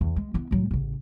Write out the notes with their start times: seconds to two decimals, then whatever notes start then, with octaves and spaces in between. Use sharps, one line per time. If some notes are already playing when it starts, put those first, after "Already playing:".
0.01 E2
0.16 G#3
0.34 B3 E4
0.51 A2 F#3
0.71 A1 C#3